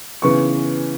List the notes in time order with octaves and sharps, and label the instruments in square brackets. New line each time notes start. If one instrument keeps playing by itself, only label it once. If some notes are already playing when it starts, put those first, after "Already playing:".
[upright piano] C#3 E3 B3 C#6